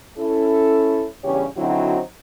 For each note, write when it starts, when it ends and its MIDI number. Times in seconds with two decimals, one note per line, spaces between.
0.17 1.07 61
0.17 1.07 64
0.17 1.07 69
1.24 1.45 40
1.24 1.45 43
1.24 1.45 49
1.24 1.45 61
1.24 1.45 67
1.24 1.45 73
1.57 1.99 50
1.57 1.99 54
1.57 1.99 60
1.57 1.99 63
1.57 1.99 64
1.57 1.99 66